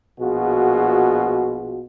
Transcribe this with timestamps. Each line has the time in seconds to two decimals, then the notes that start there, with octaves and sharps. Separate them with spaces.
0.20 A#1 B2 F4 F#4 G#4